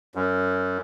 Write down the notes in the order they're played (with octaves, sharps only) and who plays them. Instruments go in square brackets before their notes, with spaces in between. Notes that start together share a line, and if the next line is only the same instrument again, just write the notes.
[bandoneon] F#2